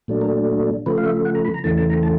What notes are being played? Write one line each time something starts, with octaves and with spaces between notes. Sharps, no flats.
A#2 F#3 A3 D4
A#4
C#3 F3 A3 B4
F5
E5
F#5
A#5
B5
A#5
E2 C#3 E3 A3 A5
A5
A#5
A5